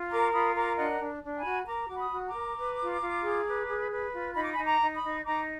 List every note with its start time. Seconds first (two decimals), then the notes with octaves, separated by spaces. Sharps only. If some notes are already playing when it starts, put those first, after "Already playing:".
Already playing: F4
0.11 A#4 A#5 D6
0.33 F4 B5 D#6
0.55 A#4 A#5 D6
0.78 D4 D#5 F#5
1.01 D4
1.23 D4
1.37 G#5 B5
1.45 F#4
1.67 A#4 A#5 D6
1.87 F#4 D6
1.97 B5 D#6
2.12 F#4
2.27 A#5 D6
2.34 A#4
2.57 B4
2.80 F4
3.01 F4
3.24 G#4
3.47 B4
3.68 G#4
3.91 B4
4.13 F4
4.35 D#4 B5
4.44 D6
4.54 G#5 B5
4.57 D#4
4.65 A#5 D6
4.81 D#4
4.95 B5 D#6
5.03 D#4
5.25 D#4 A#5 D6